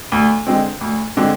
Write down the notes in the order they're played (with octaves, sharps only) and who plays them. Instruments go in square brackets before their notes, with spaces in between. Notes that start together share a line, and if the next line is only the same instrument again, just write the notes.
[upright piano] D2
D3 G#3 C4
D2
D3 G#3 C4